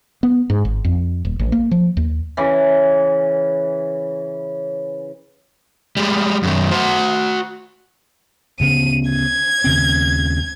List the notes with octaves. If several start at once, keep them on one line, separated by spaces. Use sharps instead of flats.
B3
G#2
G#1
F2
D#1
A1
A#3
F3
D#2
C#3 E3
G3 G#3
F#2 D#3
F#4 C5
D2 C#3 B3 D#7
G#6
D#2 C#3 C4